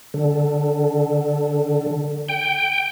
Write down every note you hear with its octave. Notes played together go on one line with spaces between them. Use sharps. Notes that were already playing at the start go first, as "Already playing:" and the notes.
D3
G5